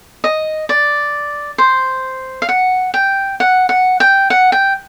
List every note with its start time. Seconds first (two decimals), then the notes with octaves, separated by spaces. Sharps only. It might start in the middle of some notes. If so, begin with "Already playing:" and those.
0.24 D#5
0.69 D5
1.58 C5
2.42 F5
2.49 F#5
2.94 G5
3.40 F#5
3.69 F#5
4.00 G5
4.30 F#5
4.52 G5